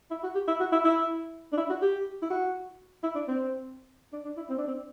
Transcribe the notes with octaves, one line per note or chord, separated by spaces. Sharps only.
E4
F#4
G4
E4
F#4
E4
E4
D4
E4
F#4
G4
E4
F#4
E4
D4
C4
D4
D4
E4
C4
D4
C4